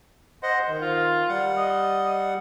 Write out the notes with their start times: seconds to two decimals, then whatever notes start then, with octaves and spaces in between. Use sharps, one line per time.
0.43 C5 D#5 F#5
0.68 D#3
0.81 F4
1.29 G3 F#5
1.57 D#5